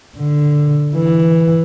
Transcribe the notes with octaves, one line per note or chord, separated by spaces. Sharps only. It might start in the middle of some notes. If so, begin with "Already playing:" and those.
D3
E3